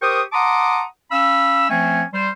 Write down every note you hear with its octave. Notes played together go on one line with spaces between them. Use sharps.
G4 A#4 C5 G5 C#6 D#6
F#5 A5 A#5 C6 D6 D#6
C#4 F5 B5 E6
F3 A3 C4 C#4 G#5
G3 C5